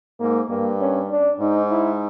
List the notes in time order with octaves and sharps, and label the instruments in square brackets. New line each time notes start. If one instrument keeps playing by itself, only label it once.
[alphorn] G#2 [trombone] A#3
[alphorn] G2 [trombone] A#3
[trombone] C#4
D4
[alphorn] G#2 [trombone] D#4
[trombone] E4